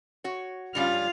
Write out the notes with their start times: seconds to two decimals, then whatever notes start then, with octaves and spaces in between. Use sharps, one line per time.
0.24 F#4 C#5
0.75 G2 G3 C#4 F4 F5